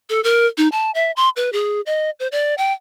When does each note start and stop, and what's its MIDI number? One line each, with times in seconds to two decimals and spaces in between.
0.10 0.23 69
0.24 0.46 70
0.58 0.68 63
0.72 0.91 81
0.95 1.11 76
1.16 1.29 84
1.36 1.52 71
1.53 1.81 68
1.86 2.10 75
2.20 2.28 72
2.32 2.55 74
2.58 2.73 79